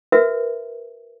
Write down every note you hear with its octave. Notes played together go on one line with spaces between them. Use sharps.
F#4 A#4 B4 E5